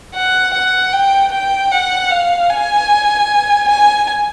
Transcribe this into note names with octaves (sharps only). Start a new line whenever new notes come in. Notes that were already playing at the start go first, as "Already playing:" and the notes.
F#5
F#5
G5
G5
F#5
F5
G#5
G#5